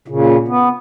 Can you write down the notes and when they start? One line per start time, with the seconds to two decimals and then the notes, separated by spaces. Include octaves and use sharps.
0.08 A#2 C#3
0.48 B3